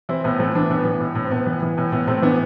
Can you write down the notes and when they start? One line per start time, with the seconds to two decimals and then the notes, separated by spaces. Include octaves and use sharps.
0.09 E3 C4 E4
0.24 A2 B3
0.39 E3 A3 C4
0.54 E3 B3 D4
0.69 A2 B3 D4
0.85 E3
1.00 A2
1.15 A2
1.25 C4
1.31 A2 B3
1.46 E3
1.62 E3
1.77 A2
1.92 A2 B3
2.07 A2 A3 C4
2.22 E3 B3 D4